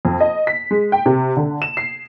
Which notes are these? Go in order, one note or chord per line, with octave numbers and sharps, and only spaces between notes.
F2
D#5
B6
G#3
G5
C3
D3
E7
C7